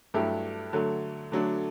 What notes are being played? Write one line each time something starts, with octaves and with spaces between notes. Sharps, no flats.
G2 F#3 A3 E4 G4
D3 F#3 A3
D3 F#3 A3 D4